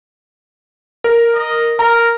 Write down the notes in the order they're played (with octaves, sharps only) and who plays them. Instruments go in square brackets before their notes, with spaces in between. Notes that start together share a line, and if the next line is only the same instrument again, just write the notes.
[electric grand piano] A#4
[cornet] D#5
[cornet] A#4 [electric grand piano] A#5